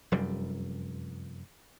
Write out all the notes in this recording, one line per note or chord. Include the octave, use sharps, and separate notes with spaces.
F1 F#2 G3